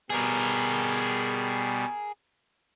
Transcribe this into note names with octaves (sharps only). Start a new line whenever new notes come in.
B2 G3 G#4 A#4